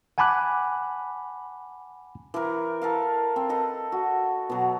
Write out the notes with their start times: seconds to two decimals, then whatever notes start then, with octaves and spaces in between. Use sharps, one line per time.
0.18 F#5 G#5 A5 B5 D6 F#6
2.34 E3 A#4
2.82 A4 A#4 F5
3.36 C4
3.49 A4 B4 D#5
3.92 F#4
4.50 B2 F#3